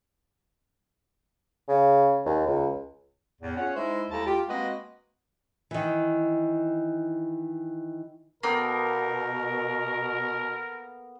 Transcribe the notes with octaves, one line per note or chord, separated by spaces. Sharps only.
C#3
D#2
C#2
E2 A2
C#4 F4 G#4 C#5 F#5
G#3 D#4 E4 C5 E5
D#2 G#3 E4 A4 A5 A#5
F4 G4
G#3 A#3 C4 F#4 B4 D#5
D#3 E3
B2 A#3 B3 A4 A#4 G5